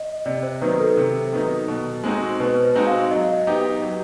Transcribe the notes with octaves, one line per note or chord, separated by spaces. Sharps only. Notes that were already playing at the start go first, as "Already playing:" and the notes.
Already playing: D#5
C3 D5
C5
D#3 F#3 B3 D#4 B4
A4
C3
D#3 F#3 B3 D#4
B2
G#3 C4 D#4 F#4
B2 B4
C5
G#3 C4 D#4 F#4
F5
F#3 D#5
B3 D#4 G4
F#3